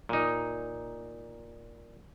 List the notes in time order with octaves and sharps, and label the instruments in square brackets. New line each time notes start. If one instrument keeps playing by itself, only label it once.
[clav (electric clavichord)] A#2 D#4